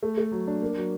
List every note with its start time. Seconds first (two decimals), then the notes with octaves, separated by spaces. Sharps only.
0.03 A3
0.17 A3
0.32 F#3
0.47 D4
0.62 A#3
0.77 F#3